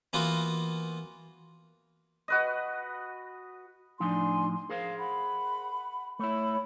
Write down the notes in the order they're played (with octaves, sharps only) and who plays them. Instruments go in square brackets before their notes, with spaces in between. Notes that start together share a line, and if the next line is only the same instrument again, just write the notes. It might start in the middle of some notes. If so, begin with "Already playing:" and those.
[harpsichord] E3 A#3 B3 F4 F#4
[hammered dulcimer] F#4 B4 D#5
[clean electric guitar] A2 F3 D#4 [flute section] D4 G#5 C6
[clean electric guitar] G#4 A#4 C5 [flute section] F5
[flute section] F#5 B5
[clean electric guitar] A3 E4 [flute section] C#5 B5